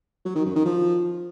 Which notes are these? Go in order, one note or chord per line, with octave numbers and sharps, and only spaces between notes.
F#3
D#3
F#2
D#3
F3